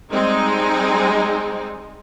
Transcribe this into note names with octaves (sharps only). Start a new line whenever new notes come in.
G3 G#3 C4 D#4